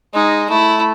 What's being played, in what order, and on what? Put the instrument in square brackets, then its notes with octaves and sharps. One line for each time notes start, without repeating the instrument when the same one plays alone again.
[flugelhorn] G#3 [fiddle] D#4
[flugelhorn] A3 [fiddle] E4